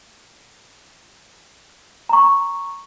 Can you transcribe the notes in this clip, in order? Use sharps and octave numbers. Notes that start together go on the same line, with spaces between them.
A#5 C#6